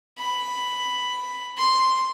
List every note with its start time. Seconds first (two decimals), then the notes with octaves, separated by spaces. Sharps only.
0.18 B5
1.57 C6